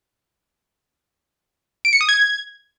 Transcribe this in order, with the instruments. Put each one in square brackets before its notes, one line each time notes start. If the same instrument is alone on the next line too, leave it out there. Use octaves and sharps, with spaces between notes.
[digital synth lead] D7
C#7
D#6
G#6